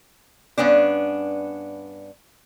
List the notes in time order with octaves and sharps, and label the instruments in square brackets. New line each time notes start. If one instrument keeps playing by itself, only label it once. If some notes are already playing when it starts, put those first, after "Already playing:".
[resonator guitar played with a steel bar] G2 B3 C#4 D4